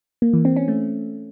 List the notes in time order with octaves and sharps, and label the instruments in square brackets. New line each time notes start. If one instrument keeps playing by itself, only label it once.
[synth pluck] A#3
E3
C4
C#4
A3